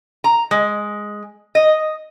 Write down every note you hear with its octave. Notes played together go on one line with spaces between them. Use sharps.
A#5
G#3
D#5